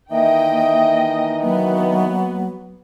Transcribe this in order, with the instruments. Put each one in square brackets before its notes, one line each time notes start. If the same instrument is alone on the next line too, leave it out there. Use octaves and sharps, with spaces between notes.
[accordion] D#3 E3 D#4 [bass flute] A#3 [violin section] D#5 G5 [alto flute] E5
[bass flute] F#3 [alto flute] A#3 [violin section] B3